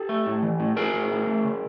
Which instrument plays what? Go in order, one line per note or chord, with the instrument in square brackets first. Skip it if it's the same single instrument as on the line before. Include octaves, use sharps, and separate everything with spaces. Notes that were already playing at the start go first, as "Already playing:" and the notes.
Already playing: [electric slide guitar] G4 A4
A3
A2
E3
A2
A2 G#4 A#4
A2
A2
A3
C#3